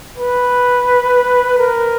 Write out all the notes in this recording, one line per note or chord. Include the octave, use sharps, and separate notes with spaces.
B4
A#4